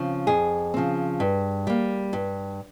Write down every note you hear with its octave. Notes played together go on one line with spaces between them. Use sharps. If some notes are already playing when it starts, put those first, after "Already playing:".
Already playing: C#3 F3 C4
F2 G#4
C#3 F3 C4
G2
G3 A#3
G2